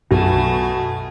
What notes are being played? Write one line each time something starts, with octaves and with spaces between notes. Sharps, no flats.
B1 F#2 B2 F#3 A3 G#5